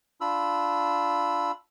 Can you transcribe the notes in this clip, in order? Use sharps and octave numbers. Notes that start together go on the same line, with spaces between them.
D4 F4 B5 E6